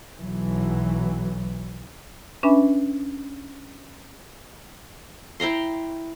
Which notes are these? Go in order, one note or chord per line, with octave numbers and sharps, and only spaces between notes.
B1 E3 F#3
C#4 D4 B4 E5 G#5 B5
E4 G5 A#5 C6